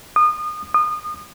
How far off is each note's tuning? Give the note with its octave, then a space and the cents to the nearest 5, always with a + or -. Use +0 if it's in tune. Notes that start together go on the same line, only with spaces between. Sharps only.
D#6 -30
D#6 -30